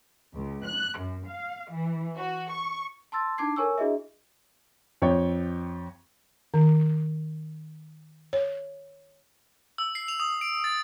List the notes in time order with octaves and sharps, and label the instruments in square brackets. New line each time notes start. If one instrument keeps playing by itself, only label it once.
[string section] C#2
F#6
F#2
F5
E3
F#4
C#6
[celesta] A5 C6 E6 A6
D4 D#4 A5 D6 G#6 C7
A4 A#4 C#5 G#5 C#6 E6
D4 E4 F#4 G#4 D#5 E5
[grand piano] F2 C#5 D5 G5
[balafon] D#3
C#5
[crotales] E6
C7
F7
D#6
D7
A6